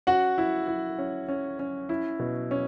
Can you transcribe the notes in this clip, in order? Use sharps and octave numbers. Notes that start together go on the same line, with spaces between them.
C#4 F#4 F#5
E4
E4
C#4
C#4
C#4
E4
B2
C#4